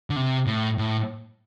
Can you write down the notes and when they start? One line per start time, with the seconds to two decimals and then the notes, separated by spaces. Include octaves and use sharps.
0.10 D3
0.16 C3
0.47 A2
0.78 A2